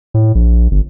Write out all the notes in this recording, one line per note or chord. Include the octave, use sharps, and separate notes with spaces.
A2
A#1
G1